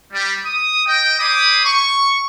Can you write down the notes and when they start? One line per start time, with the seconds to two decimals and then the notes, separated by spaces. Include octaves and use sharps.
0.12 G3
0.45 D#6
0.86 D#5 G5
1.19 C#5 F5 G5 B5 D6 D#6
1.65 C#6